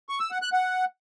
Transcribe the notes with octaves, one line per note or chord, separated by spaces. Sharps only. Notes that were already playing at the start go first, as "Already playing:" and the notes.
C#6
E6
F#5
F#6
F#5